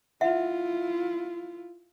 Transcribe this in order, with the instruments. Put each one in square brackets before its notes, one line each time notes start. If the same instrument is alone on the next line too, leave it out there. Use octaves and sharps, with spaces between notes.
[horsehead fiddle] E4 F4 [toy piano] E5 F#5